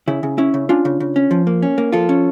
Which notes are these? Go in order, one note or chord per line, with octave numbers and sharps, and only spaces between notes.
C#3 E4
C#3
C#4 E4
C#3
C#4 D4 F4
C#3
C#3
C#4
F3
A#3
C#4
A#3
F3 F4 A4
C#4